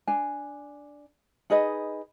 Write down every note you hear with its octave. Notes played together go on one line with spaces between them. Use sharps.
D4 G#5
D#4 G#4 B4 D#5